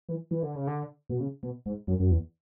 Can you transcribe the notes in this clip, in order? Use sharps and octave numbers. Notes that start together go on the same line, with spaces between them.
E3
E3
D3
C#3
D3
B2
C#3
B2
G#2
F#2
F#2
E2